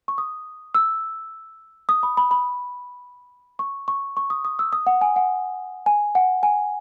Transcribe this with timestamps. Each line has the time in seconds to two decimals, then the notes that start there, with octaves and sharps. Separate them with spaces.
0.08 C#6
0.18 D#6
0.75 E6
1.89 D#6
2.03 B5
2.17 B5
2.31 B5
3.59 C#6
3.88 C#6
4.17 C#6
4.30 D#6
4.45 D#6
4.59 E6
4.73 D#6
4.87 F#5
5.01 G#5
5.16 F#5
5.86 G#5
6.15 F#5
6.43 G#5